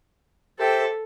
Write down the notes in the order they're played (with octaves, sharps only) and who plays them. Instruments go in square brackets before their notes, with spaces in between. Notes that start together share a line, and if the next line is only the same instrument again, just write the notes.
[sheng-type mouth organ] G4 C5 E5 G5 [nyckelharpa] A4